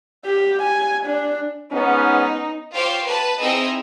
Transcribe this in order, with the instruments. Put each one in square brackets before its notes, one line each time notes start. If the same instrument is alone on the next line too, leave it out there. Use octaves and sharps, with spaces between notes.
[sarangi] G4
G#5
D4
[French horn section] G#2 B3 C#4 [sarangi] D#4
[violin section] F4 G4 C5 C#5 F5 G5
B4 A5
C4 D#4 E4 G#4 D#5 E6